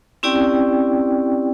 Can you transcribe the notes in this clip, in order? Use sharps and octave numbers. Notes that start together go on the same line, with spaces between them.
C4 C#4 E4 G4 D5 G5